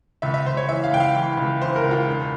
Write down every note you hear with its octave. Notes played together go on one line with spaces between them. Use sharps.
C#2 E5
E5
C#2 C5
C#5
E3 E5
F5
C#2 G5
F5
E3 G5
C#2
E3 C5
A#4
C#2
F4
E1